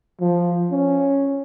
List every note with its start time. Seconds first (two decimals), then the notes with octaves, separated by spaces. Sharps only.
0.20 F3
0.71 C#4